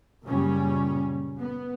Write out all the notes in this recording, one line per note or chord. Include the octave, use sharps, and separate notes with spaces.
F#1 A#2 C#3 G3 C#4
B3